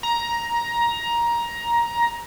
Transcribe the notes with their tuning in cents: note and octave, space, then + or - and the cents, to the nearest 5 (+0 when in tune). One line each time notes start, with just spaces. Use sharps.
A#5 +15